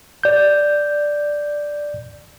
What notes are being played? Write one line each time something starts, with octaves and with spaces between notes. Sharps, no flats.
D5 G6